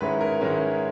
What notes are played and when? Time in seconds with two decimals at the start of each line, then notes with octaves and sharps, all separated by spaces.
0.01 G#2 D#3 G#3 C#4 E4 B4
0.21 A#4
0.41 G#2 D#3 G#3 C#4 E4